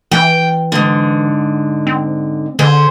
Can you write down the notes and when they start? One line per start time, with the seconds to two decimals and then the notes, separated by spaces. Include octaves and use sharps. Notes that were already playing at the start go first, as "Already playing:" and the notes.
0.11 E3 G5
0.72 G#2 D3
1.87 C4
2.59 D3 G#4 C5